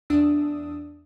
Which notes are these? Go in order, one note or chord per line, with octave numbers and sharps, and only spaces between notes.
E2 D4 D#6 E6